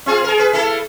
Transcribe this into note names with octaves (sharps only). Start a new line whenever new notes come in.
C4 F4 G#4
G#4 A#4
G#4 B4
A#3 E4 A4